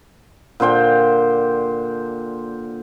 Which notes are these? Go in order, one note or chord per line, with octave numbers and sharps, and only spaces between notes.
A#2 D3 C5 G5